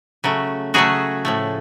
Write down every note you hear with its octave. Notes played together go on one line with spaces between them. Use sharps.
C#3 F#3 A3
C#3 F#3 A3 F#4 G#4
A2 F3 A3